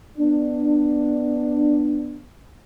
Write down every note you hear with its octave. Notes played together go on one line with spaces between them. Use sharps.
B3 D4